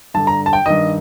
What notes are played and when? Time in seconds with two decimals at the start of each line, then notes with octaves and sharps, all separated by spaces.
0.14 G2 D3 A5
0.27 A#5
0.46 A5
0.53 G5
0.66 G2 D#3 D#5